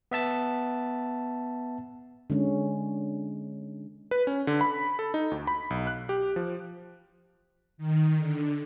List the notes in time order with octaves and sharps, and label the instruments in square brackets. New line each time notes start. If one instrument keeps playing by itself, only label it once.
[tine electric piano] B3 E5 A5 A6
[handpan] D3 G#3 C#4
[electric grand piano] B4
C#4
D3
B5
A4
D#4
D2
B5
B1
F#6
G4
F3
[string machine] D#3
D3